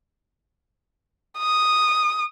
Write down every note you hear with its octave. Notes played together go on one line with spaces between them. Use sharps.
D#6